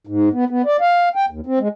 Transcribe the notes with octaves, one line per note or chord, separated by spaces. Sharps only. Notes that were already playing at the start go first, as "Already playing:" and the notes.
G#2
B3
B3
D5
F5
G5
D#2
C4
G#3